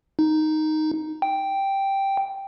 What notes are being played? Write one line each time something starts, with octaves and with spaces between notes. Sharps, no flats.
D#4
G5